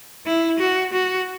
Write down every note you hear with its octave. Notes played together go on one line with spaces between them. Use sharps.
E4
F#4
F#4